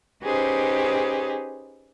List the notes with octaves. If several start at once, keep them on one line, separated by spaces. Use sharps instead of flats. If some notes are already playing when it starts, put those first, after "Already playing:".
C#4 D#4 G4 G#4 B4 C5